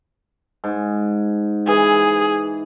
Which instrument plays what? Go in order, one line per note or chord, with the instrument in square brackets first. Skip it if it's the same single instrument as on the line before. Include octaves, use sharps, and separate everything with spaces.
[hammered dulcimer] G#2
[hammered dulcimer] E3 [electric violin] G#4